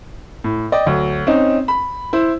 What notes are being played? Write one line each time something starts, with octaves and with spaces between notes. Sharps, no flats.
A2
D5 D#5 G5
D2 F#3
C4 C#4 D#4
B5
E4 C5